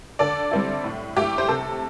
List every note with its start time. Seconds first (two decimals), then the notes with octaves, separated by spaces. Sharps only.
0.19 D3 A4 D5
0.51 G3 C4 E4
0.84 A2
1.17 A3 E4 G4
1.38 C5
1.49 C3 A4